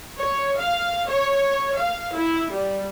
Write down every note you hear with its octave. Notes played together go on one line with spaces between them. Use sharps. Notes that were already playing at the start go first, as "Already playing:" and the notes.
C#5
F5
C#5
F5
E4
G3